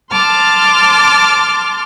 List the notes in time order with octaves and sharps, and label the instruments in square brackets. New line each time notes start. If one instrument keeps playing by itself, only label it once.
[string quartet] A5 C6 D6 F6